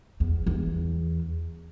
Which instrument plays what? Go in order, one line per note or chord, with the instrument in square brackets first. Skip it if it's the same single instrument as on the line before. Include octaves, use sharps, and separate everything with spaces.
[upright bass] E2
E2